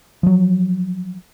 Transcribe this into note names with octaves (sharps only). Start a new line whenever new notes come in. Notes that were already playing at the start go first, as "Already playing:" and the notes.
F3 F#3